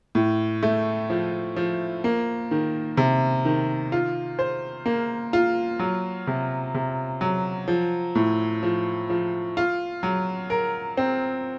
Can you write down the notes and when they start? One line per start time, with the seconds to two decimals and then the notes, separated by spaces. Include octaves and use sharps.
0.15 A2
0.63 A3
1.10 F3
1.56 F3
2.04 A#3
2.51 D#3
2.97 C3
3.45 D#3
3.92 F4
4.39 C5
4.86 A#3
5.33 F4
5.79 F#3
6.27 C3
6.74 C3
7.21 F#3
7.68 F3
8.15 A2
8.63 F3
9.10 F3
9.57 F4
10.03 F#3
10.50 A#4
10.97 C4